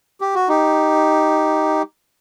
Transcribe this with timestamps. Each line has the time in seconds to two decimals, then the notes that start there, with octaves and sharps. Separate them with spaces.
0.21 G4
0.35 F#4
0.49 D#4 G4